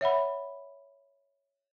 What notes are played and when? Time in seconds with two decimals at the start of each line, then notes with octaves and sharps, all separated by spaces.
0.01 C#5 E5 F#5 B5